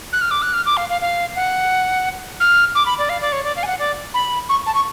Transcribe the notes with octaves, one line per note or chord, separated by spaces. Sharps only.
F#6
F6
D6
F#6
F6
D6
F5
F5
F5
F#5
F6
D6
B5
D5
F5
D5
C#5
D5
F5
G#5
F#5
D5
B5
C#6
A5
C#6